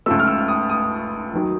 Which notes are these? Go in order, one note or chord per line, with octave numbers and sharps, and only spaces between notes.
C#2 C#3 F3 A3 E6
F6
E6
D#6
D#6
D#2 D#3 F#3